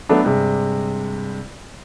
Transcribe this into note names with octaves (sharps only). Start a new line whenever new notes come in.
F#3 A3 B3 D4
G2 C3 G#3